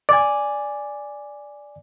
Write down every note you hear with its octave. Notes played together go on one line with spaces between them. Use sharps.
D5 G#5